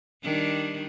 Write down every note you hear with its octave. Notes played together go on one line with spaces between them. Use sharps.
D#3 G3 D4